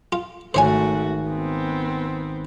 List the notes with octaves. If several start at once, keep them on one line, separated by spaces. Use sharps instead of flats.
F4
G#1 A3 F#4 C5 C#5 G#5
B3 C4